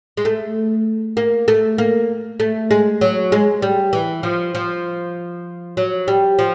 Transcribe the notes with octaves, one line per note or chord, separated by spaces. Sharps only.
G#3
A3
A#3
A3
A#3
A3
G#3
F#3
G#3
G3
E3
F3
F3
F#3
G3
F3